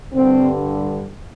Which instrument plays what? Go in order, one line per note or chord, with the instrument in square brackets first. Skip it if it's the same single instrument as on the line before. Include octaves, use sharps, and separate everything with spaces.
[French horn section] G2 D3 C4